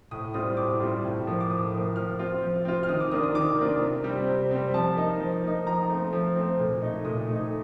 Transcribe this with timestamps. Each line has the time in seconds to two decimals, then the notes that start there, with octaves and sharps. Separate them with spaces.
0.11 A2 D#6
0.34 G3 C4 F4 D#6
0.57 A2 D6
0.80 G3 C4 F4
1.04 A2
1.27 F3 A#3
1.41 D6
1.50 A2 D#6
1.73 F3 A#3
1.96 F3 F6
2.19 C4 F4
2.43 F3
2.65 C4 F4
2.83 F6
2.89 D#3 D#6
3.00 D6
3.12 A#3 D4 F4 D#6
3.23 D#6
3.35 D#3 D6
3.59 A#3 D4 F4
3.81 C3
4.04 G3
4.09 C4
4.27 C3
4.51 G3 C4
4.74 F3 A5
4.96 A#3 D#4
5.20 F3
5.44 A#3 D#4
5.66 F3 A#5
5.89 A3 C4
6.13 F3
6.36 A3 C4
6.60 A#2
6.82 A3 D#4
7.05 A#2 D#6
7.29 A3 D#4